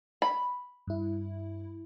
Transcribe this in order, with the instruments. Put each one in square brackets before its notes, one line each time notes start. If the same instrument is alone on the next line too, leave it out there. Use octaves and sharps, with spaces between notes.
[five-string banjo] B5
[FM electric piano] G2 E4